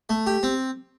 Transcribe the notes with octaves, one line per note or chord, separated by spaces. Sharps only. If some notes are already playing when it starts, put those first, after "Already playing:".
A3
G4
C4